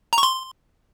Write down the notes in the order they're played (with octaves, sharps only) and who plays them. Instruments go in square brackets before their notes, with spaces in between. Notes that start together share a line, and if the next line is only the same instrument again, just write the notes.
[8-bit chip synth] A#5
C#6
C6